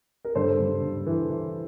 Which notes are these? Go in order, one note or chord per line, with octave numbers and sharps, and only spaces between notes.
A#4
G2 A4 C5
G2
G2
E3
E3